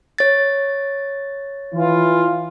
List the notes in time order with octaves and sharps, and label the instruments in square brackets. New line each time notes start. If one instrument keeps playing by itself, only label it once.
[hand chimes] C#5 A6
[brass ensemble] E3 F4